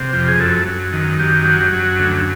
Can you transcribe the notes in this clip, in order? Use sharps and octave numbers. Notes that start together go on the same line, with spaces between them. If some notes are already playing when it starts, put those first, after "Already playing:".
Already playing: C3
F2
G#4
F#2 A4
F#2
D#3
F#2 G4
F#3
F#2
D2